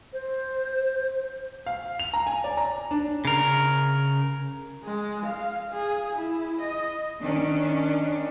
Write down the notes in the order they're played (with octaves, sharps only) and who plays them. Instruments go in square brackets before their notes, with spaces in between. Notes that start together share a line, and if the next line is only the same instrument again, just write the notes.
[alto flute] C5
[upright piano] F5
F7
A#5
G#5
D5
A#5
D4
[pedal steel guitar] C#3 A#4
[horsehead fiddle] G#3
F5
G#4
E4
D#5
[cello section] D#3 C#4 D4